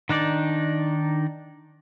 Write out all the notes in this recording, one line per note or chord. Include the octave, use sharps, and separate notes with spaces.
D#3 D4 D#4 D5